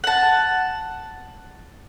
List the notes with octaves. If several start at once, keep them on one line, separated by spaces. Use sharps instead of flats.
F#5 A5